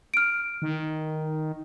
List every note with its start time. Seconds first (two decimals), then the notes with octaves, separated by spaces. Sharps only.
0.14 F6 D7
0.62 D#3